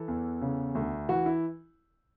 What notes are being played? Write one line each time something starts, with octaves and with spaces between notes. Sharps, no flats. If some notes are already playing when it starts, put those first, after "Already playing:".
Already playing: E3 A4
E2
C#3
D2
E3 F#4
E4